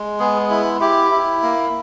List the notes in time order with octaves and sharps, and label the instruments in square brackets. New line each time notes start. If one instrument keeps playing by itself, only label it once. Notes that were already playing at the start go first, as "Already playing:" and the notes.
Already playing: [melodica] G#3
B3 G#4
E4
E4 G4
E4
A#3